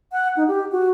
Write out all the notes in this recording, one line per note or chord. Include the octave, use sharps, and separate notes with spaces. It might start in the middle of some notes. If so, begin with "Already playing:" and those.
F#5
D#4
G4
F#4